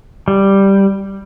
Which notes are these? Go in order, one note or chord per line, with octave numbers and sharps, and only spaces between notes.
G3